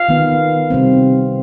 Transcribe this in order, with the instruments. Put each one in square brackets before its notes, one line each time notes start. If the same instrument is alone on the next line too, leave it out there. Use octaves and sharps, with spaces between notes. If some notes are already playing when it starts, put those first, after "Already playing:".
Already playing: [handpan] F5
D#3 B3
C3 G3 C4